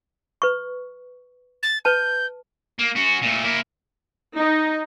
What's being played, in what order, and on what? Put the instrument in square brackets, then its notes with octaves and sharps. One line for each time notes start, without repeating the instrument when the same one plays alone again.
[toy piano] B4 C#6
[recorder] A6
[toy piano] B4 A5 [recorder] G6
[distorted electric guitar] A#3
C#4 F#4
A#2 A3
A#3 E4
[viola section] D#4